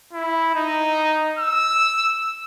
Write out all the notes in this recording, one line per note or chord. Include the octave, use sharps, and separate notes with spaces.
E4
D#4
E6